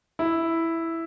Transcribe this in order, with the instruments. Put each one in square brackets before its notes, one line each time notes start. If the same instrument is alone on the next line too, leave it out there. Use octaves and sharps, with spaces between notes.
[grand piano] E4